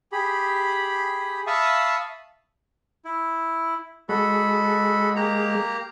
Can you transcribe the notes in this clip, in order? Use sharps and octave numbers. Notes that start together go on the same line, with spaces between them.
G4 G#4 B5
E5 F5 A5 B5 C#6 D#6
E4
G#3 F#4 A4 B5
A#3 G4 A#5